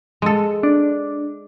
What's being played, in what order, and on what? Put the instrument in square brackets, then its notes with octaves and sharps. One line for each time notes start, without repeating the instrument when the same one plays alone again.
[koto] G#3 A4
[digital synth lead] D4